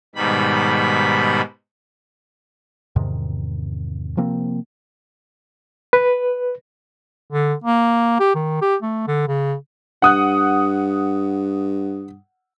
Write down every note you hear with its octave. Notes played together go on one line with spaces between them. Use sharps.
G#2 B2 D#3 G3 B5
E2 G#2 C3 D#3
C3 F3 A#3 C4
B4
D3
A#3
G4
D#3
G4
A3
D3
C#3
G2 F#5 D#6 F#6